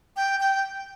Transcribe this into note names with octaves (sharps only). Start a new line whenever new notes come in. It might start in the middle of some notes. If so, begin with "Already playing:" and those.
G5
G5